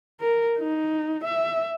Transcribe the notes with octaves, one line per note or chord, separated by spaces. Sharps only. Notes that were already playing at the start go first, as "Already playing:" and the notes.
A#4
D#4
E5